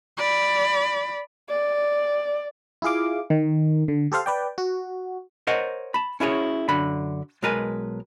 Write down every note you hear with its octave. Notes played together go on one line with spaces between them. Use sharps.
D5 B5
D5
E4 F4 G#4 F5 D6
D#3
D3
G4 A4 C5 F5
B4 D5 G5
F#4
A#4 C5 C#5 D#5 F#5
A5 B5
C#4 E4 F#4 G#4 B4 C#5
F#2 D3 B5
B1 G#3 A#4 B4 G#5